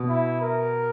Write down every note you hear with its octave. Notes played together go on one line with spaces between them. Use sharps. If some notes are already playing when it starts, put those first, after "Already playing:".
Already playing: B2
E4
A#4